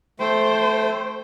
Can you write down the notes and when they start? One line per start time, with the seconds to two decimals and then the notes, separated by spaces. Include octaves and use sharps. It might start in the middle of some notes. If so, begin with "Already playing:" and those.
0.20 A3 C5 G5